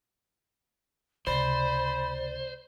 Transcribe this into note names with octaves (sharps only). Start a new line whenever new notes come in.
C#2 C3 C5 D5 B5